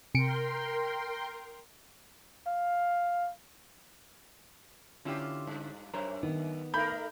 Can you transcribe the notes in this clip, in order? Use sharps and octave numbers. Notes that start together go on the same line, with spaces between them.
C3 A#4 G5 C6 C#7 D7
F5
D3 C#4 E4 F4 G4
G2
F#2 A#4 C5 C#5
D#3 B3
A3 D#4 A#4 B5 G6